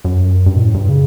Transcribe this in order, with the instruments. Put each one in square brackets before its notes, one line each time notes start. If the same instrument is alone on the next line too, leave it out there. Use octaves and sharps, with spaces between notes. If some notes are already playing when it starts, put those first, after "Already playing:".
[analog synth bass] F#2
G2
B2
A2
G2
C#3